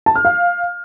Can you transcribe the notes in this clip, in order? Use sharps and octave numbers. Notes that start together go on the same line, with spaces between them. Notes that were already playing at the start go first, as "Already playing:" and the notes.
A5
F6
F5